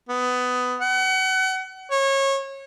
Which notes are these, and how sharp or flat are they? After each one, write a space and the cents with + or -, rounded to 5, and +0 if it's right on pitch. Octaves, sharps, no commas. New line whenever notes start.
B3 +15
F#5 +35
C#5 -25